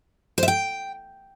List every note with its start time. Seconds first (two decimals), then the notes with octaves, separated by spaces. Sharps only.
0.38 C5
0.43 E5
0.48 G5